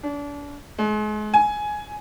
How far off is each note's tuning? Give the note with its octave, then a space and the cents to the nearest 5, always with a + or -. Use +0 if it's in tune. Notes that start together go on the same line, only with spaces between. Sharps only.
D4 -35
G#3 +35
G#5 +10